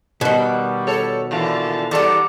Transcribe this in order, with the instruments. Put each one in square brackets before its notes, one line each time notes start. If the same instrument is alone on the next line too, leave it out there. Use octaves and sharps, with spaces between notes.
[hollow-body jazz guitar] B2 D#3 [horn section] G3 [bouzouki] F#4
[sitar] A4 C#5
[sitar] A#2 D3 E3 [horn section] F5 A5
[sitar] D#2 B3 A4 [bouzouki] G3 D4 [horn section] G4 F#5 A#5